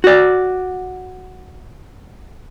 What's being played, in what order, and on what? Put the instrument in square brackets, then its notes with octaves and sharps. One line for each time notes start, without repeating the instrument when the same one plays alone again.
[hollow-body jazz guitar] F#4 D5